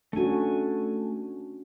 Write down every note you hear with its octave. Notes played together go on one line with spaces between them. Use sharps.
A3 C#4 D4 F#4 G#5